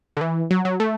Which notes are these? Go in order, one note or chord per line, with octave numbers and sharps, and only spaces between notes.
D3
E3
F#3
F#3
A3